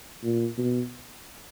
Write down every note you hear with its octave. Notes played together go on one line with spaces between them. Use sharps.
A#2
B2